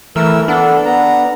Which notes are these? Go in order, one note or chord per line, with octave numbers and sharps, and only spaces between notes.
E3 A3 A#4 E6
B3 D4 A4
B3 A#5